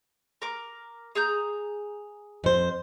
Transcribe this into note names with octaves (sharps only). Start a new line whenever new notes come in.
A#4 D6
G#4 A#5 G6
F2 C5